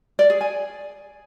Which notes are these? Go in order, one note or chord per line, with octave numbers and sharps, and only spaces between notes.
D5
G#4
G#5